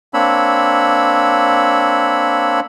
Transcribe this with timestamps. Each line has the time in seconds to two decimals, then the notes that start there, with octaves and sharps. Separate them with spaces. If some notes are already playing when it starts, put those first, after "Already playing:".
0.14 A#3 C4 D4 C#5 B5 E6